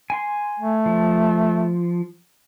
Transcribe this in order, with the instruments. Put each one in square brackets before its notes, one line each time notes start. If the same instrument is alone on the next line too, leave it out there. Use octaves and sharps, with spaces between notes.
[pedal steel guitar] G#5 C6
[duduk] A3
[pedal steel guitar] F3